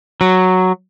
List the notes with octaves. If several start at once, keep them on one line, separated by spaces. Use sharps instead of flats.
F#3